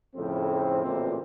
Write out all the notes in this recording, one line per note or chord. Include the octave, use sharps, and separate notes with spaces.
F2 A2 C#3 C4
A1 D2 A#2 D3 G#3 C4